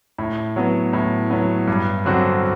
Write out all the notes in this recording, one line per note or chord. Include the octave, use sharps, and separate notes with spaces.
A2
F#3 B3
A2
F#3 B3
G2
D3 F#3 C4 F#4